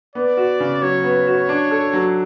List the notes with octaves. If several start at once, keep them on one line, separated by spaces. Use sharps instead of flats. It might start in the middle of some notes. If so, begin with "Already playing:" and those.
B3 D5
F#4
C#3
F#3 C#5
B3
F#4
D4
A4
F#3